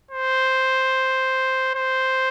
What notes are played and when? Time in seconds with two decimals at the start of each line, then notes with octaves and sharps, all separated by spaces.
0.11 C5
1.75 C5